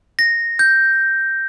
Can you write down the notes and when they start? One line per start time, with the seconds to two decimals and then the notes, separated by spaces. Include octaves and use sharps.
0.19 A#6
0.59 G6